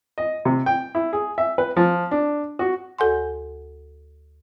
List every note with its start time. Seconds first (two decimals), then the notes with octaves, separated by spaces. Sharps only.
0.18 D#5
0.45 C3
0.66 G5
0.95 E4
1.13 G#4
1.38 E5
1.58 B4
1.77 F3
2.11 D4
2.59 F#4
2.99 D2 F#4 A4 F#5 G#5 C6